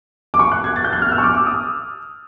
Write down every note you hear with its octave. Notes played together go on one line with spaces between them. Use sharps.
D6
C#6
F#6
G#6
A6
G6
F#6
F6
E6
C#6
D6
D6
D#6